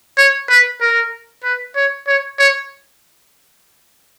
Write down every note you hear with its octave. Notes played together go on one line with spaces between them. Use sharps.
C#5
B4
A#4
B4
C#5
C#5
C#5